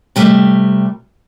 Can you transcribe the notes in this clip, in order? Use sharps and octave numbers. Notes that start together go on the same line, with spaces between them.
C3 G3 A3